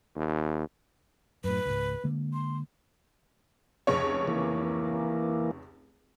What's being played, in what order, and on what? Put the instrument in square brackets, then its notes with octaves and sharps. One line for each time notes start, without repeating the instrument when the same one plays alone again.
[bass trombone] D#2
[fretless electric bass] F#2 A2 [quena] B4
[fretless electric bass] C#2 G#2
D3 G#3 A#3
[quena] C6
[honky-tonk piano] F1 C#2 C#5
[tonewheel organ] E3 A#3